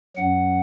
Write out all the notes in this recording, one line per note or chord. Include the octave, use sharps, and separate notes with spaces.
F#2 F#3 F#5